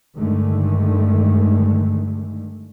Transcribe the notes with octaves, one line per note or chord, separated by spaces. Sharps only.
G2 D3 D#3 G#3 A3